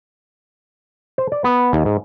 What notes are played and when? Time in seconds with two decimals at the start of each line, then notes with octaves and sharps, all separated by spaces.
1.18 C5
1.32 D5
1.44 B3
1.73 D#2
1.85 G#2